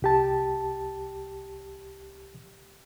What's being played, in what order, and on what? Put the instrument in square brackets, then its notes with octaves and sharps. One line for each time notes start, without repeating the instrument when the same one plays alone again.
[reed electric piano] C2 G4 A5